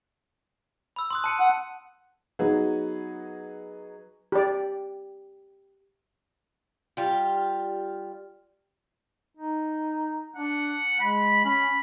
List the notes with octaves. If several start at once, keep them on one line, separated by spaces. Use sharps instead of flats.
B5 E6
C6 D#6 F#6
A5 C#7 D#7
F#5
F#3 B3 D#4 G#4
G4 D5
G3 F4
D#4
D4 F#5
G#3 B5
C#4 B5